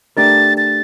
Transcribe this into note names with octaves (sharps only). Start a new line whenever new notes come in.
A3 D4 G4 A#4 A6
A6